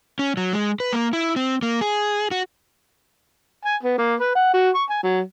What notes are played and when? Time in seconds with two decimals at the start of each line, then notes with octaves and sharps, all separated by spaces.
0.19 C#4
0.37 F#3
0.53 G#3
0.80 B4
0.93 A#3
1.13 E4
1.36 C4
1.62 A#3
1.81 G#4
2.31 F#4
3.65 G#5
3.83 B3
3.98 A#3
4.20 B4
4.35 F#5
4.53 F#4
4.75 C#6
4.90 G#5
5.03 F#3